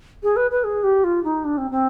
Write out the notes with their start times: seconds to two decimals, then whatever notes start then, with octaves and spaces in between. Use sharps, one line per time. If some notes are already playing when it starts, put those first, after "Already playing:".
0.23 G#4
0.36 B4
0.51 B4
0.64 G#4
0.83 G4
1.04 F4
1.23 D#4
1.44 D4
1.57 C4
1.71 C4